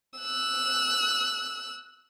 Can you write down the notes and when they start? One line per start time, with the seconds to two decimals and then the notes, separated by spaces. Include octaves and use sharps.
0.20 E6 F#6